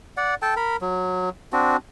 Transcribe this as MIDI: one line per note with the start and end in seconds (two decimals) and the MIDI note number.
0.17 0.35 74
0.17 0.35 78
0.42 0.54 69
0.42 0.54 79
0.42 0.54 81
0.56 0.76 70
0.56 0.76 83
0.81 1.29 54
1.53 1.77 60
1.53 1.77 62
1.53 1.77 66